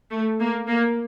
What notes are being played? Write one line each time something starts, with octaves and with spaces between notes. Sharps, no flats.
A3
A#3
A#3